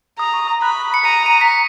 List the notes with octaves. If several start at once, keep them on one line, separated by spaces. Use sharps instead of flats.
A#5 D#6
C#6
D#6
B5 F#6
C#7
A#5 D#7
D#7
B6
C#7